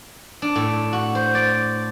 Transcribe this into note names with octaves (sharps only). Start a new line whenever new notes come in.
D4
A2
F#4
C5
D5